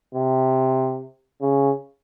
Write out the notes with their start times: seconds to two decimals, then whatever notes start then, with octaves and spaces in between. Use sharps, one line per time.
0.14 C3
1.41 C#3